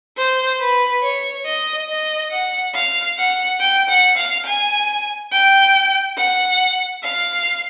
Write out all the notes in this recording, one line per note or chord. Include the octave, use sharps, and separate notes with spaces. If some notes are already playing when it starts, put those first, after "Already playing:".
C5
B4
C#5
D#5
D#5
F#5
F5
F#5
G5
F#5
F5
G#5
G5
F#5
F5